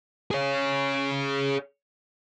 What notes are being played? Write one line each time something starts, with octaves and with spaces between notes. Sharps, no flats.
G#4 C#5